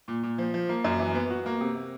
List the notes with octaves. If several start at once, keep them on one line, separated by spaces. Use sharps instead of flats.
A#2
A#2
F3
F3
A#3
F#2
E3
B3
F#4
A#3
C3